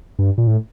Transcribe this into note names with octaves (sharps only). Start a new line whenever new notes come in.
G2
A#2
A2